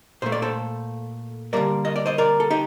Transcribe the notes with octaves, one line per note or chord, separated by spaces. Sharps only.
A#2 A3 C5
D5
A4 C5
D3 G3 A#3 A#4 D5
D#5
D5
C5 D#5
A#4 D5
A4
D#4 G4